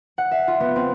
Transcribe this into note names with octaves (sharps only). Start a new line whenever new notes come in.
F#5
E5
F4
B3
C4